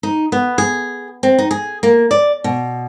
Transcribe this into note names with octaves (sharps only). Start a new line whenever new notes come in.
D#4
B3
G#4
C4
D#4
G#4
A#3
D5
B2